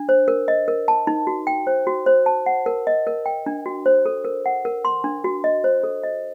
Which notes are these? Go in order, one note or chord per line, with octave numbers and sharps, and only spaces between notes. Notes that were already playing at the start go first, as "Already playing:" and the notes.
Already playing: D4
C5
A#4
D#5
A#4
A5
D#4
F#4
G5
C5
F#4
C5
A5
F#5
A#4
D#5
A#4
G5
D4
F#4
C5
A4
A#4
F#5
A#4
C6
D4
F#4
D#5
C5
A4
D#5